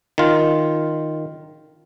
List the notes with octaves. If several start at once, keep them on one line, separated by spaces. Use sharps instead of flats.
D#3 F4